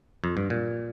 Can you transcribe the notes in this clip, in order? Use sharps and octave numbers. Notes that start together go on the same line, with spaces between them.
F2
G2
A#2